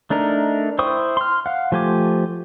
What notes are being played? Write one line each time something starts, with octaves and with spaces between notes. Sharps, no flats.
A3 D4 D#4 A#4
E4 C5 G5 C#6 D#6
C6 F6
F5 F#5
F3 A3 G4 G#5 D6